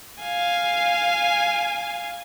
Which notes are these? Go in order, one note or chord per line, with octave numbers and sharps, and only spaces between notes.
F5 G#5